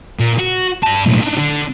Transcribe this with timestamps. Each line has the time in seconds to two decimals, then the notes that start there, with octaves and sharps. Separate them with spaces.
0.20 A#2
0.39 F#4
0.83 G2 A5
1.06 B1 A2
1.20 D4 D#4
1.37 D3